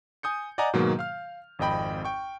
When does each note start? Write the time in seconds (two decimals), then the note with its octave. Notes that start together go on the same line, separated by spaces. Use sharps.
0.23 G#5 D#6 G6 C#7
0.58 D5 D#5 F#5 G#5 A#5
0.73 G#2 B2 D#3 F#3 A#3
0.99 F5 F6
1.59 G#1 F2 D#5 G5 B5
2.05 G5 C#6